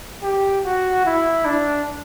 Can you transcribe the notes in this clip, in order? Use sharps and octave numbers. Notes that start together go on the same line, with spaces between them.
G4
F#4
E4
D4